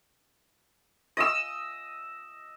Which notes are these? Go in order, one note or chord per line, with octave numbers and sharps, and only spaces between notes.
D#5 E6